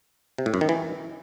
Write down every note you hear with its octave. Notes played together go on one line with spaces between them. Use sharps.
C3
A2
F#2
D#3
E3